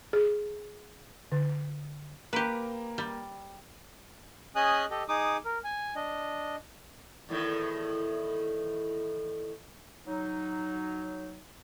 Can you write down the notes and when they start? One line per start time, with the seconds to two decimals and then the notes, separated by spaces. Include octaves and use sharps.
0.13 G#4
1.32 D3
2.33 A#3 G4 B4 A#5 D7
2.98 G3
4.56 C#4 G#4 D#5 G#5 D#6 F#6
4.91 G4 A4 D#5
5.09 D#4 G#4 D6 D#6
5.45 A#4
5.64 G#5
5.96 D4 D#5
7.29 E2 A2 D#3
10.06 F#3 D#4